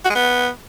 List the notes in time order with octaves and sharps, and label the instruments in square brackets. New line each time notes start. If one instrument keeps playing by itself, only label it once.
[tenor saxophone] F#4
G#3
B3